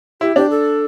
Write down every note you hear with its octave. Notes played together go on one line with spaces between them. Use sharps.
E4 G4
D4 G4
A4